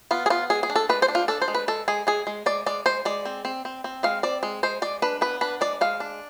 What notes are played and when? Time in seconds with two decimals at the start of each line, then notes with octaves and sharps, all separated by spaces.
0.11 B3 F4
0.26 G#4
0.30 B3 F4
0.50 G#3 G#4
0.63 G#4
0.70 D4
0.76 A4
0.89 G#3 B4
1.02 C5
1.08 D4
1.15 F4
1.28 D4 A4
1.42 C5
1.48 G#3
1.55 B4
1.68 G#3 A4
1.88 G#3 G#4
2.07 G#3 G#4
2.27 G#3
2.46 G#3 D5
2.66 G#3 D5
2.86 G#3 C5
3.05 G#3 D5
3.25 C4
3.45 C4
3.65 C4
3.84 C4
4.03 G#3 F5
4.23 C4 D5
4.43 G#3
4.63 G#3 C5
4.82 G#3 D5
5.02 D4 B4
5.21 B3 B4
5.41 D4 B4
5.61 G#3 D5
5.81 G#3 F5
6.00 D4